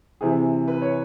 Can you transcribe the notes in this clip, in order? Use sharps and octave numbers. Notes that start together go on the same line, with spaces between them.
C3 E3 G#4
B4
C#5